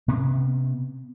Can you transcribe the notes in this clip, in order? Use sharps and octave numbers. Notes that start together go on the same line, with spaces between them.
C3 B3 C#4